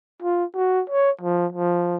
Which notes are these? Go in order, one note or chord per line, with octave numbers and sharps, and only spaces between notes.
F4
F#4
C#5
F3
F3